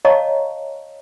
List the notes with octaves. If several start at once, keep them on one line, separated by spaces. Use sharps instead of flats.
C#5 D#5 F5 A5 A#5 C#6